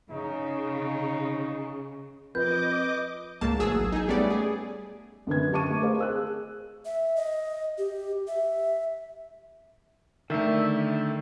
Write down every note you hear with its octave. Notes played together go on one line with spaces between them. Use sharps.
C#3 D#4
F2 B4 D#5 D6 G6
C#2 G#2 A#3 A5
A1 F#3 G#4 E6
D#4 G#4
G3 A3 B3 C#4 D5
G#4
F#2 D3 B4 G#6
G4 D#5 A5 C#6 D6 D#7
A3
G#4 A#4 C5 D#5 F5
G#4 E6 F#6
E5
D#5
G4
E5
D3 D#3 A3 E5